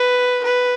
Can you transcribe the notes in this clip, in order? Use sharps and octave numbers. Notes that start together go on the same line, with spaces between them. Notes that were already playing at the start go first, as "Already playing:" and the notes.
Already playing: B4
B4